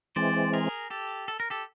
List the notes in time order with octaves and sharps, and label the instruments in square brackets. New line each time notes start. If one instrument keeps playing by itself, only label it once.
[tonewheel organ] E3 G#3 C4 [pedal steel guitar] C5 D5
[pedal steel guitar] G#4 A#4
G4 A4
A4
A#4
G4 A4